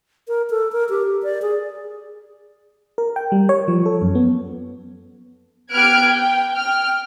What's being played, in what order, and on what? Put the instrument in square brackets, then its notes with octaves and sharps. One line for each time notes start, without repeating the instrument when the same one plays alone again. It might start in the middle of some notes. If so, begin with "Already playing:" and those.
[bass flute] A#4
A4
A#4
G4
D5
G#4
[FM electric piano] A#4
G5
G3
C#5
F3
A4
F#2
B3
[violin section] B3 G4 F6 F#6 G#6 D7
G5
G5 F6